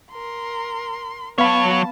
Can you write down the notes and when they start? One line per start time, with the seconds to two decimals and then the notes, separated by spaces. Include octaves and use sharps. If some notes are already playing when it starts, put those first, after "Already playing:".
0.11 A#4 C6
1.38 F#3 B3 C#5 F5 A5 B5